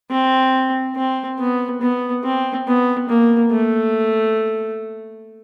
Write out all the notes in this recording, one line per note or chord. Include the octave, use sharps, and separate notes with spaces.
C4
C4
B3
B3
C4
B3
A#3
A3